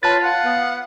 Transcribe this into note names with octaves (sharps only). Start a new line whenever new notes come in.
F4 B4 C#5 A5 A6
F5 F#5
B3